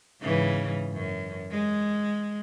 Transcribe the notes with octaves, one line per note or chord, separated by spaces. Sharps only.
G#2 C#3 E3
F#2
G#3